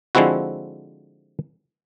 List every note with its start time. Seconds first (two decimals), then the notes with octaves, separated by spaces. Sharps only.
0.15 D3 F3 G#3 C4 E4 F#4